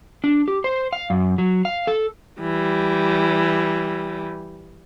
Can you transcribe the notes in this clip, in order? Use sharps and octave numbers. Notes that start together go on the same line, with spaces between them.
D4
G4
C5
F5
F#2
F#3
F5
A4
E3 G3